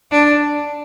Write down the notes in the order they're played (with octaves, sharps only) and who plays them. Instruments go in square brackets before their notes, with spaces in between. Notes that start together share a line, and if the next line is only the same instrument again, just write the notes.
[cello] D4